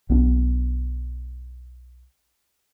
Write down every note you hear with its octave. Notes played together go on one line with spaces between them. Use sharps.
B1 B3 C#4 D4